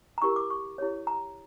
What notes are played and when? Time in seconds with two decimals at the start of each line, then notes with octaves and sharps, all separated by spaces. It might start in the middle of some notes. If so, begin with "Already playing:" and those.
0.18 A#5
0.22 E4 G4 A#4 C#6
0.36 D6
0.50 C#6
0.78 E4 G4 C#5
1.07 A#5